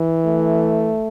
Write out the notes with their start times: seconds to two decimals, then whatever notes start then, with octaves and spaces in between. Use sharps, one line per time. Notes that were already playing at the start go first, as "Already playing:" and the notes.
Already playing: E3
0.26 A3